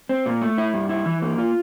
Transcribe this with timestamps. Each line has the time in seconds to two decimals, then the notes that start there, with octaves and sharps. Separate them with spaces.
0.09 C4
0.26 A#2
0.41 A3
0.58 E4
0.74 G2
0.89 E4
1.06 E3
1.22 A#3
1.38 F4